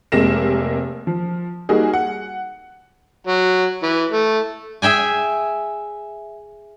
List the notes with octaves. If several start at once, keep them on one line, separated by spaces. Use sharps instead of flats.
F1 C3 G#3 A#3 A#6 E7
F3
G3 A#3 D#4 F#4 G#4
F#5
F#3
E3
A3
G#4 E5 G5 G#5